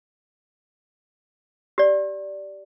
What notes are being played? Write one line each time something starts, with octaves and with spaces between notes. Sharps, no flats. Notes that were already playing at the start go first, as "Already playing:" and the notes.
G4 D5